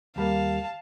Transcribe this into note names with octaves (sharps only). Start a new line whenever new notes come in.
D#2 G3 A#3 F5 A5